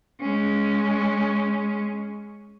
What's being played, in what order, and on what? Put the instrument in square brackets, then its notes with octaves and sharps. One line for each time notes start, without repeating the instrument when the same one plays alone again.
[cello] G#3 C#4